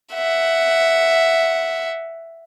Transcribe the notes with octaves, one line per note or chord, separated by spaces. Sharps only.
E5 F#5